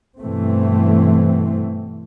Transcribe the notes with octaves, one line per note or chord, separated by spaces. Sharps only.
G2 B2 E3 A3 C4